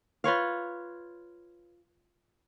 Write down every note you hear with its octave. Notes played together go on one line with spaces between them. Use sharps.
F4 B4 C#5 F5